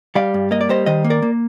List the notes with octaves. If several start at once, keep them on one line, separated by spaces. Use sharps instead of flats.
G3 D5 F5
G2
A#3 D#5
D5
G3 C5 D#5
D#3 C5 D#5
A#3
A#4 D5
A#3